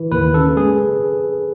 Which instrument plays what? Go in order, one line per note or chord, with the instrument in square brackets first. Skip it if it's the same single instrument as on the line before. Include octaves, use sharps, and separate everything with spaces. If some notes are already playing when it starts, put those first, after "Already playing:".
Already playing: [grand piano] E3
[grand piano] D#2 [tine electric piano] B4
[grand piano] C#3 [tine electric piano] A4
[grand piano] G#3 [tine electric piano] G#4